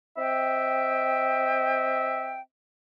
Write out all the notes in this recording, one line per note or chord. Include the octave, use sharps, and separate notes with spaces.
C4 D#5 E5 G5